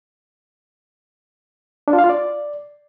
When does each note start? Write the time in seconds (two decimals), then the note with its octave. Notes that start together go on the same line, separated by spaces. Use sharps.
1.88 D4
1.93 F4
1.99 F5
2.04 F4
2.09 D5